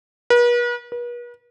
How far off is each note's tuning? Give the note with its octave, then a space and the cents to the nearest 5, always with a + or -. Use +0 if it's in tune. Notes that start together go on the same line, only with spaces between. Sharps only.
B4 -45
B4 -45